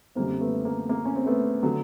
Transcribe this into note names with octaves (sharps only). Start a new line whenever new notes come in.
F#2 D3 G3 A#3 C4
A3 B3
A#3
A#3
C#4
C4
A3 B3
D3 F#3